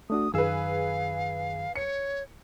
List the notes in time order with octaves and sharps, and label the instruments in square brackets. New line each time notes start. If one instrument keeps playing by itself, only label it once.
[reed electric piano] A3 D4 F#4 [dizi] D#6
[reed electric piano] F#2 D#3 E6 [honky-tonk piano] G#4 B4 [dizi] F5
[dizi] C#5 [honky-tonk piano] C#7